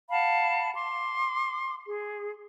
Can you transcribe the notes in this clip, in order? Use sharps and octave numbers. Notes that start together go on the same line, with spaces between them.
F5 F#5 A5 B5
C6 D6
G#4